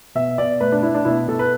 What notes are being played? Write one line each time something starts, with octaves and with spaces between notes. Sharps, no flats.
B2 E5
B2 D5
A3 B4
D4
A3 E4
D4
B2 E4
B2 A4
B4